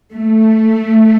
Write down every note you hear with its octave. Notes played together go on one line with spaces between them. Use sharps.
A3